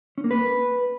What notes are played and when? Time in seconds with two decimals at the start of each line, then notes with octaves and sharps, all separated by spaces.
0.18 C#4
0.24 A#3
0.31 B4